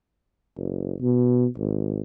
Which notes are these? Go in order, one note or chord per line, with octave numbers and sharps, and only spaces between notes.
F#1
B2
G#1